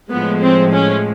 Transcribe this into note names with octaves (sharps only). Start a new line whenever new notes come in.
A2 F3 G#3 B3
C4
C#4